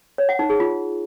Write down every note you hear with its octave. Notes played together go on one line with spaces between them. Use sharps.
C#5
F#5
D#4
G#4
F4